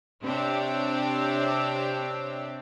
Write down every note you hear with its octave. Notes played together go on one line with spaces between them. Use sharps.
C3 C4 D4 G4 C#5